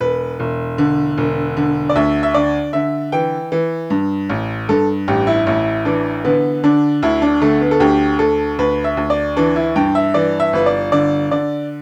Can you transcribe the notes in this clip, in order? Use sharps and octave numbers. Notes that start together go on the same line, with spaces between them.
E1 B4
E1
D3
E1
D3
D5
D2 E5
E5
D3 D5
D3 E5
E3 G5
E3
G2
A1
G2 A4
A1 G4
E4
A1 E4
E3 D4
D3 B3
D3 D4
D2 E4
D4
D3 A3
B3
A4
D2 G4
D2 A4
D2 B4
E5
D2
D5
E3 D4
E4
G2 G5
E5
E3 D5
E5
G1 B4
D5
D3 D5
D3 D5